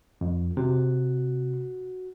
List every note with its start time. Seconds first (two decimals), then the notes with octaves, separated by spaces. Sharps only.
0.21 F2
0.57 C3 F#4